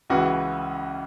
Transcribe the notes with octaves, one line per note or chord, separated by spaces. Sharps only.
C#2 C#3 E3 F#4